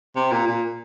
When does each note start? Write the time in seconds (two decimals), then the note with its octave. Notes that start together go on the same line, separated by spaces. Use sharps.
0.16 C3
0.31 A#2
0.47 A#2